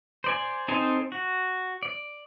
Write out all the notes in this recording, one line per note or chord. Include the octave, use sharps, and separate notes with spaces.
C5 D5 G#5
C4 D#4 A4 C5 G#5
F#4
D5